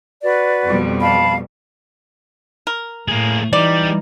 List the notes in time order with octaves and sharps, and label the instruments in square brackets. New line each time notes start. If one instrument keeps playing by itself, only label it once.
[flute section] F#4 B4 D5
[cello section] F2 B2 G3
[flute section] F5 A5 B5
[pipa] A#4
[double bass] A2 [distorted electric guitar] A#3 G#4
[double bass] E3 D#4 [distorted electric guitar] G3 [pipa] D5